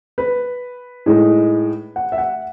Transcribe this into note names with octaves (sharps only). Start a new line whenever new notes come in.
B4
A2 G#3 D#4
F#5
E5
F#5